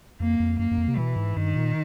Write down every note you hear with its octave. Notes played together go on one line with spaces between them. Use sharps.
F2 A#3
F2
F#2 A#3
F#2
F2
C3
B2 E3
G#2
G2 D#3
A#2